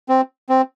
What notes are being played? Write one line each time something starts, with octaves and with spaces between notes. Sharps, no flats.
C4
C4